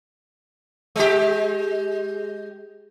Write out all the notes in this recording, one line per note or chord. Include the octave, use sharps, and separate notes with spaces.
G#3 G4